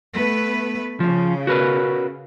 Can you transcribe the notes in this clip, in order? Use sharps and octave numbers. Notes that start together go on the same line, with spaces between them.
A3 B3 B4
C#3 F3
F#4 A#4 B4